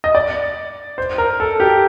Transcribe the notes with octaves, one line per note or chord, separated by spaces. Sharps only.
D#5
D5
C5
A#4
A4
G4